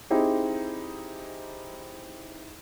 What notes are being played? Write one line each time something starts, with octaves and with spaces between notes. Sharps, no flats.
C4 D#4 E4 G4 G#4